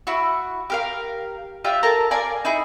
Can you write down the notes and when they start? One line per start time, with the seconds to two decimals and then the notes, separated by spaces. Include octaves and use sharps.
0.07 E4 F#4
0.70 G4 A#4 F5
1.64 F4 G4 D5 E5
1.83 A4 A#4 A5 A#5
2.11 A#4 D5 F5 G#5
2.45 D#4 E4 G#4